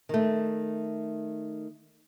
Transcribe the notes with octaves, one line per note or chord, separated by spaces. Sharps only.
D#3 A3